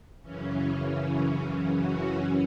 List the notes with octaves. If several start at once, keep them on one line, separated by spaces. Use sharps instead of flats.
F#2 C#3 E3 C#4
C#4
C#4
C#4
F#4
F#2 E3 C#4